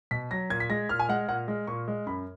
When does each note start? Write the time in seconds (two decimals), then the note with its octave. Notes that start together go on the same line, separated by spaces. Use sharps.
0.11 B2 B6
0.31 F#3 A#6
0.50 A#2 G#6
0.60 B6
0.70 G#3 A#6
0.89 A#2 F6
0.99 G#5
1.09 G#3 F#5
1.28 A#2 F#5
1.48 G#3
1.67 A#2 C#6
1.88 G#3
2.06 F#2 B5